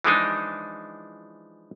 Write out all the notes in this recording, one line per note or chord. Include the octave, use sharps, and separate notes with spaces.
E3 F3 G#3 D4 D#4